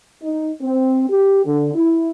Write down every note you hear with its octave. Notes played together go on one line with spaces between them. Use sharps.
D#4
C4
G4
D3
E4